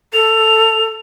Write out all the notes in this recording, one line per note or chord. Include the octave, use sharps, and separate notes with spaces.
A4 F7